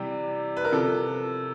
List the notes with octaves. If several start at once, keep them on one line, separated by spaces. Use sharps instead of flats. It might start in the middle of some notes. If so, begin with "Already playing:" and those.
Already playing: C3 E3 G3 G4
B4
A#4
C3 F3 A4